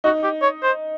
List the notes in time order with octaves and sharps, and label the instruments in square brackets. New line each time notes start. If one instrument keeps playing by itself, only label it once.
[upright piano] D#4 [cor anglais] F#4
[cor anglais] G4
C#5
C5